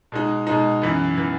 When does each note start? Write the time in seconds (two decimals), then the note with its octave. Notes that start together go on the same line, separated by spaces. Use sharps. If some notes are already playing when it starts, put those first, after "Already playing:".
0.12 B2 G#3 D#4
0.47 B2 G#3 D#4
0.82 F#2 E3 B3
1.18 E3 B3